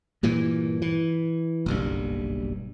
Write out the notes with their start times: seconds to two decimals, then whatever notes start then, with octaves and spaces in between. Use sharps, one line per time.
0.23 G2 A#2 E3
0.82 E3
1.66 F#1 B1 G2